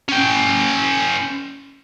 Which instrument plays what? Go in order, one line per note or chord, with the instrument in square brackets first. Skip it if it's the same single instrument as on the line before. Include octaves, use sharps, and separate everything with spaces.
[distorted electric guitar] C#4 G5